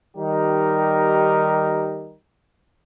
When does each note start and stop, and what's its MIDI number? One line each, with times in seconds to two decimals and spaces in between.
0.17 2.15 51
0.17 2.15 55
0.17 2.15 63
0.17 2.15 67
0.17 2.15 70